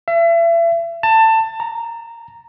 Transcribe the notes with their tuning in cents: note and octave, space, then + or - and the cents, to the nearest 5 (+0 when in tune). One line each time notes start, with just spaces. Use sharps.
E5 +35
A5 +20
A#5 -10